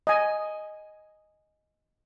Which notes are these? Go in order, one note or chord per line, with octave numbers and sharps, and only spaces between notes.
D#5 G#5